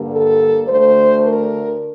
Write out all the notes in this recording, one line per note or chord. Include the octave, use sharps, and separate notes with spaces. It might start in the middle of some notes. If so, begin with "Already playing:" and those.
Already playing: G2 D3 G3 A#3
A4
D2 D3 A3 C5
A#4